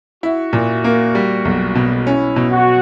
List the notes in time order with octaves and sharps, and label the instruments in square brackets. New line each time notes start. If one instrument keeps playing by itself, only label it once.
[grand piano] E4 [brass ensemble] F#4
[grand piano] A#2
A#3
G3
B1
B2
[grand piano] C#4 [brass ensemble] E4
[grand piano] B2
[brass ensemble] F#4